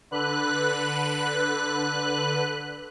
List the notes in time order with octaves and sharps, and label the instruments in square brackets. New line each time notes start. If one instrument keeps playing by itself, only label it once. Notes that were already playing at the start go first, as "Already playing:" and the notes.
[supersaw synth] D3 B4 F#6